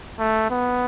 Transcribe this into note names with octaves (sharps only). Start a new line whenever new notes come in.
A3
B3